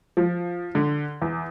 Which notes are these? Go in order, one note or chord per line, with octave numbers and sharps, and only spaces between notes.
F3
D3
E2